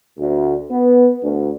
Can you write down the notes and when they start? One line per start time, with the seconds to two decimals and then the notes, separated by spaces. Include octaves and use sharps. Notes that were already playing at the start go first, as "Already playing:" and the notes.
0.19 D2
0.70 B3
1.22 D2